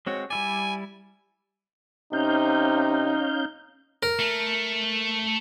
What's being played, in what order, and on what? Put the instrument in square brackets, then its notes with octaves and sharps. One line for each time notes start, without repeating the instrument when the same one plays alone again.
[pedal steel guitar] G#3 C4 F#4 [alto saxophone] C#5
[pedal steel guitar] G3 E4 D5 [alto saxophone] G#5
[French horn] C3 [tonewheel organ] C#4 F5 G6 [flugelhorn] D#4
[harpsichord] A#4
[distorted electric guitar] A3